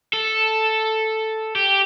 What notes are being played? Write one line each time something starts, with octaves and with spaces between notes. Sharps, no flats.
A4
G4